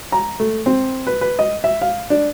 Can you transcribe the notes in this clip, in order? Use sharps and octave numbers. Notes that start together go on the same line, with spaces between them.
A#5
A3
C4
B4
B4
D#5
E5
F5
D4